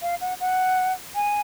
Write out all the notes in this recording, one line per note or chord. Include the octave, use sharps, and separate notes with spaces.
F5
F#5
F#5
G#5